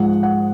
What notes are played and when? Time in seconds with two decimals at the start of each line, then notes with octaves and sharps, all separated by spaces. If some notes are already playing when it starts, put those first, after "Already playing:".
Already playing: G#2 F3 G#3 F#5
0.23 F#5